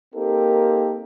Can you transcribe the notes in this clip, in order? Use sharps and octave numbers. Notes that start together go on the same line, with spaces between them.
A#3 C4 D#4 G4 A4 A#4